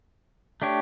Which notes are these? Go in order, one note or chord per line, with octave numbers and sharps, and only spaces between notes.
A3 D4 G4 C#5